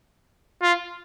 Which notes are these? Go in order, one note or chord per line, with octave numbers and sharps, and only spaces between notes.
F4